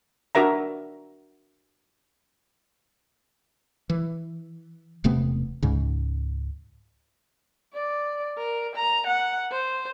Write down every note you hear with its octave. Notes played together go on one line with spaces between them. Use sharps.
D4 F#4 A#4 E5 A#5
E3
E1 C3 A3 B3
C#2 G#2 C#3
D5
A#4
A#5
F#5
C5